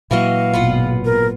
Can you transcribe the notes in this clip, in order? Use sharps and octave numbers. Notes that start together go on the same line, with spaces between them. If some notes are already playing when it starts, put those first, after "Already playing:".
A#2 E3 F#3 A#3 F#4 D#5 F5
G#1 E2 B2 F4 B4 F#5
A#4